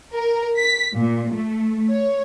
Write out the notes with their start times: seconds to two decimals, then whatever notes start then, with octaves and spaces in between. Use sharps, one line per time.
0.14 A#4
0.58 B6
0.96 A#2
1.33 A3
1.91 C#5